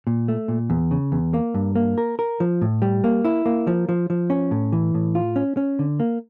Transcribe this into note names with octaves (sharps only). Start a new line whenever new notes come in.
A#2
A3
A#2
E2
C#3
E2
A#3
G2
A#3
A#4
A#4
F3
A2
G3
A#3
E4
A#3
F3
F3
F3
C#4
A2
E3
A2
F4
C#4
C#4
D3
A#3